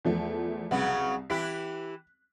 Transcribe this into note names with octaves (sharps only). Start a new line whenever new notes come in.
E2 F3 A3
C2 C#3 F#3 B3
E3 E4 G4 F#6 B6